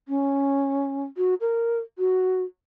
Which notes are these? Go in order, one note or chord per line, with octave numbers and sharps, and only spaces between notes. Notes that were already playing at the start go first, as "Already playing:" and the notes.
C#4
F#4
A#4
F#4